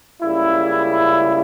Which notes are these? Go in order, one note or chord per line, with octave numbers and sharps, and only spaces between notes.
C#2 C#3 G3 A#3 E4